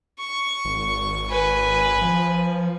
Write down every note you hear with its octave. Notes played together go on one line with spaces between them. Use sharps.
C#6
G#1
B4 G#5
F3